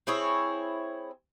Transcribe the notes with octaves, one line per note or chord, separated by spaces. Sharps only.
C4 E4 G#4 C#5